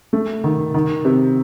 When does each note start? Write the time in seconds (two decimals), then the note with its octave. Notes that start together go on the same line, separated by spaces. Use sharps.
0.13 A3
0.44 D#3
0.74 D#3
1.05 C3